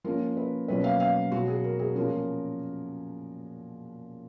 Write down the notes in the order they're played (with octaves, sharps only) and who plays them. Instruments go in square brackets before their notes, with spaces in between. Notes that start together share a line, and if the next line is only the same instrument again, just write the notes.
[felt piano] F3 A#3 C#4 A#4
B4
B2 F#3 A#3 C#4 B4
F5
F5
B2 F#3 B3 F#4
G#4
A#4
G#4
A#2 F3 A#3 C#4 A#4